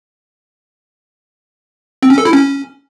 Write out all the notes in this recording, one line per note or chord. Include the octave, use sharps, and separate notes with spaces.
C4
C#4
A4
E4
C#4